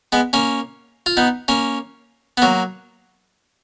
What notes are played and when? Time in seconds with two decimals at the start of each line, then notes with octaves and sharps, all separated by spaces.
0.12 G#3 B3
0.33 A#3 C#4
1.06 F4
1.17 B3 D#4
1.48 A#3 C#4
2.37 B3
2.42 F#3 A#3